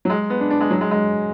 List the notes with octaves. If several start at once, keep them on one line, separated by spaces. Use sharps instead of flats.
F#3
G#3
B3
D4
D4
G#3
F#3
G#3
G#3